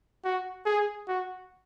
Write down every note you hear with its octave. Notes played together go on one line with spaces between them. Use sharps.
F#4
G#4
F#4